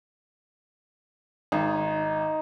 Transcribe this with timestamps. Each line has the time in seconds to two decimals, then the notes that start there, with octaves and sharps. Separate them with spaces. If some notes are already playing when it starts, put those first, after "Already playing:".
1.52 G#1 D#4